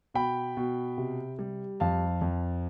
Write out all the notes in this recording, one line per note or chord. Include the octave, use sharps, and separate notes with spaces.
B2 G5 B5
B2
C3
G3
F2 F5 A5
F2